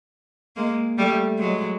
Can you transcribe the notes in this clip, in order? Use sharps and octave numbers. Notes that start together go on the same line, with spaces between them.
G#3 A#3
G3 A3
F#3 G#3